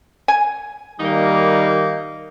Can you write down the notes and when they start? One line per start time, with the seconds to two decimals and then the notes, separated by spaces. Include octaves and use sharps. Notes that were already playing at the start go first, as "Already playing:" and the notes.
0.28 G#5
1.00 D#3 G3 A#3 D#4